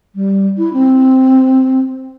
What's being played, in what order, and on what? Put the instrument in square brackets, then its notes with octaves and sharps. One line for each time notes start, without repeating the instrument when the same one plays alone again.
[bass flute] G3
E4
C4